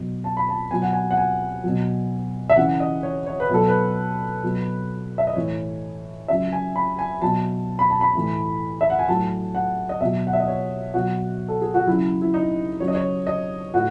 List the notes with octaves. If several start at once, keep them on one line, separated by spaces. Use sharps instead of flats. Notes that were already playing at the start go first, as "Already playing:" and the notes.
Already playing: B2 F#3
A5
B5
A5
B2 F#3 G#5
F#5
G#5
F#5
G#5
B2 F#3
E5
C#3 E3 F#5
D#5
C#5
C#5
B4
B2 F#3 A4
B4
B2 F#3
E5
D#5
A2 E3 C#5
C#3 F#3 E5
G#5
B5
G#5
B2 F#3 A5
B5
A5
B5
A2 E3
E5
F#5
G#5
A2 F#3 A5
F#5
D#5
B2 F#3 E5
F#5
E5
D#5
C#5
B2 F#3 F#4
A4
G#4
F#4
C#3 F#3 E4
E4
D#4
C#3 F#3 C#5
D#5
C#5
D#5
A2 F#4